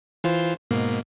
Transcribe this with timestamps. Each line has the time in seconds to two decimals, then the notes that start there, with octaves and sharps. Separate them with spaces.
0.24 E3 F4 C5
0.71 G#2 B2 A#3